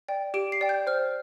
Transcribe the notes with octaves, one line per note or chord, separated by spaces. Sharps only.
D5 G5
G4 D7
C7
D5 G5
G6
C5 F6